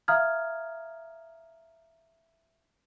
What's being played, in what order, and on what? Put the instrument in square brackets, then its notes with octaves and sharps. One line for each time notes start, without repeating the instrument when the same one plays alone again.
[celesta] E5 F5 A#5 D#6 F6 G#6